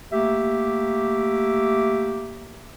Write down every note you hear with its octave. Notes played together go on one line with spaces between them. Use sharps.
A3 A#3 G4 E5